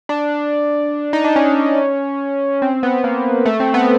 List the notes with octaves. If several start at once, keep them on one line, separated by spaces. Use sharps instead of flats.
D4
D#4
D4
C#4
C4
B3
A#3
A3
C4
B3